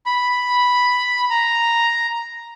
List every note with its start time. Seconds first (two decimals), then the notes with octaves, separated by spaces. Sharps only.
0.06 B5
1.30 A#5